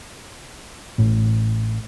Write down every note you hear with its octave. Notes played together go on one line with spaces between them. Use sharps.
A1 A2